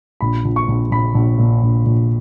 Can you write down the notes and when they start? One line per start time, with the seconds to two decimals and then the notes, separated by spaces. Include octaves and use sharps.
0.21 A#1 B5
0.45 A#1
0.56 C#6
0.68 A#1
0.91 A#1 B5
1.15 A#1
1.38 A#2
1.63 A#1
1.86 A#1